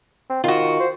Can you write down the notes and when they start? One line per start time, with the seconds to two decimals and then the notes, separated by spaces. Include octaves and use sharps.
0.29 C4
0.44 D#3 F4 F#4
0.80 C5